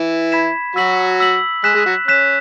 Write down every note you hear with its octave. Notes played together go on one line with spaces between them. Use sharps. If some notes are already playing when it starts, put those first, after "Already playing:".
Already playing: E3 E4
B5 G#6 B6 E7
F#3 F#4 E6 B6 F#7
E6 B6 F#7
G#3 G#4 F#6 B6 E7
G#3 G#4
F#3 F#4
C#4 F#6 B6 E7